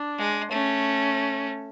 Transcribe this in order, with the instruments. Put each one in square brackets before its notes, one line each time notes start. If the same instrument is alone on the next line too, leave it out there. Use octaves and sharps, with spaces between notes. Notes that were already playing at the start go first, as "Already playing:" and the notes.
Already playing: [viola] D4
[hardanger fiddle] G#3
[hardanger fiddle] A3 [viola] C#4